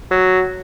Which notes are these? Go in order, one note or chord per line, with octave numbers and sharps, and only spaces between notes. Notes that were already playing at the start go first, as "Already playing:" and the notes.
F#3